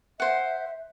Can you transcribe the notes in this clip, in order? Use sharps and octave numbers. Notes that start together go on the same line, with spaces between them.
C5 E5 F#5